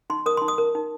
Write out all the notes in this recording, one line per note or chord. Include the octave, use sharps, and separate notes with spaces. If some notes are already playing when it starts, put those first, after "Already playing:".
D#4 C6
A#4 D#6
D#4 C6
D#6
A#4
D#4